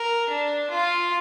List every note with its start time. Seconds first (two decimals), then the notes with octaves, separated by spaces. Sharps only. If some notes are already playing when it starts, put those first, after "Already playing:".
Already playing: A#4
0.29 D4
0.70 F4